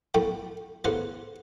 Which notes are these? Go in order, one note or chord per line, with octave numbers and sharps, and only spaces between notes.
B1 F#2 A2 G5 B5
D#2 A2 C#3 B3 B4 C5